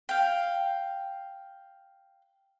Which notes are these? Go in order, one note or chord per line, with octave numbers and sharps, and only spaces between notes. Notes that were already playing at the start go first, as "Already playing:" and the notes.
F5 G5